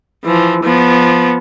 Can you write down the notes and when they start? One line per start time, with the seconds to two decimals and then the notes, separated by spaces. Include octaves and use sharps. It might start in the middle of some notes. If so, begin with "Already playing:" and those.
0.24 E3 F3
0.63 F3 B3